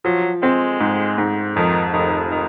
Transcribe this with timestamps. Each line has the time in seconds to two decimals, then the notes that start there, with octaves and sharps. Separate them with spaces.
0.05 F3 F#3
0.42 G#3 C4
0.80 G#2
1.18 G#2
1.56 F2 D#3
1.93 F1 D#3
2.31 D#3